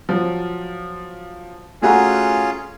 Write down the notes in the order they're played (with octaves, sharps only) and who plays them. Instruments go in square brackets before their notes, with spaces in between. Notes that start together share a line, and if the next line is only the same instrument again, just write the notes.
[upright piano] F3 F#3
[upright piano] A3 F#4 A#5 [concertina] C#4 F4 G#4